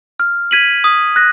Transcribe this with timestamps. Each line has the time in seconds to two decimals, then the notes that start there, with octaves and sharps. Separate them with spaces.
0.20 F6
0.51 G#6 B6 D#7 F#7
0.84 D#6
1.16 F#6 A#6